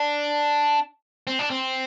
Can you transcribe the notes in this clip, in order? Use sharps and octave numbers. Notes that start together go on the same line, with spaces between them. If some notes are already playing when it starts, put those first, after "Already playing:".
Already playing: D4
C4
D4
C4